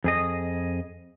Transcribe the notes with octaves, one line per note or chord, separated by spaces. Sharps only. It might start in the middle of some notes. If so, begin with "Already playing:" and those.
F2 G#4 D#5